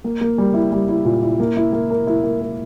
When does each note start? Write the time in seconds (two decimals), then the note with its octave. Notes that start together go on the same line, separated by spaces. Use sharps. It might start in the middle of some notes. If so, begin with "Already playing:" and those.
0.04 A#3
0.21 A#3
0.38 G3
0.54 E4
0.72 G3
0.89 E4
1.05 A#2
1.23 E4
1.40 A#3
1.57 E4
1.73 A#3
1.90 A#4
2.07 E4
2.23 A#3
2.41 A#4